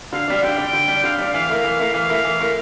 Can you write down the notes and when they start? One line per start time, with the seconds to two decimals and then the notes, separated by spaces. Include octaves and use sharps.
0.13 D3 F5
0.28 G3 D4
0.43 D3 G5
0.58 G3 D4
0.73 D3
0.88 G3 D4
1.04 D3 F5
1.19 G3 D4
1.34 E3 F5
1.49 A3 E4 A#4
1.64 E3
1.79 A3 E4 A#4
1.94 E3 F5
2.09 A3 E4 A#4
2.24 E3
2.39 A3 E4 A#4